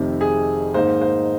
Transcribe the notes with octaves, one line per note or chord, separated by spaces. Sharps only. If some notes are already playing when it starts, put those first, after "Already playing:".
Already playing: F1 F2 C3 D#3
G#4
G#2 D#3 A#3 D#4 C5
C5